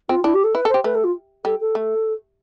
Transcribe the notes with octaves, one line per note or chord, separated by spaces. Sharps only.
C4 F4
D4 E4
G4
A4
E4 B4
A4
C5
G4
A3 B4
A4
F4
G3 A4
A4
A3